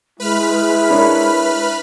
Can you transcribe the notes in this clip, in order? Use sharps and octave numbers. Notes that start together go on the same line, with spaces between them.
G#3 E4 B4 B5 F6
D4 A#4 C#5